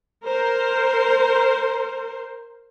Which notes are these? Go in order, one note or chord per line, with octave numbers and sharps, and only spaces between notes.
A#4 C5